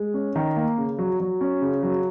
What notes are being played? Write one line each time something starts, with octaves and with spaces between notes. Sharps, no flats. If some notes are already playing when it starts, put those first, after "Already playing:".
Already playing: G#3
C#4
D#3
A#3
C#3
F#3
F#3
C#4
C#3
F#3